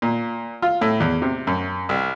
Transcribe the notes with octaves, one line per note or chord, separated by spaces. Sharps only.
A#2
F4
A2
E2
C3
F#2
C2